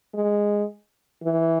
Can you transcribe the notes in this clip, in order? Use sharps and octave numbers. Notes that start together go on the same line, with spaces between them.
G#3
E3